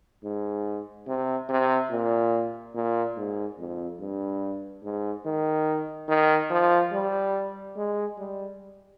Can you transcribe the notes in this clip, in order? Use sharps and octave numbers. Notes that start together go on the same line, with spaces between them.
G#2
C3
C3
A#2
A#2
G#2
F2
G2
G#2
D#3
D#3
F3
G3
G#3
G3